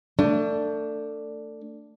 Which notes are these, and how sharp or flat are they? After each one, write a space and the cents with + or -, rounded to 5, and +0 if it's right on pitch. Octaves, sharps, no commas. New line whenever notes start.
A3 +30 D4 +0